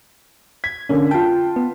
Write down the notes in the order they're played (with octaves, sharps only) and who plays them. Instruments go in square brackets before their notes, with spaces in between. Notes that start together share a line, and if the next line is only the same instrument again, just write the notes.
[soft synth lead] G#6 [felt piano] B6
[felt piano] D3 A#3 [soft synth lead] C#4
[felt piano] F4 A5 [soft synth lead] G5
[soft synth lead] B3